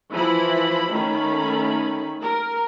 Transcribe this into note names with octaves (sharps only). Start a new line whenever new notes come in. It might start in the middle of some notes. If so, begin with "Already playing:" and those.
E3 F3 E4 B5
D#3 A3 C#4 B5
A#4